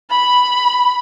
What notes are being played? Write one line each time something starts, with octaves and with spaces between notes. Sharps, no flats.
B5